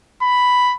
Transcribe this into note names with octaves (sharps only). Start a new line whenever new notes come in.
B5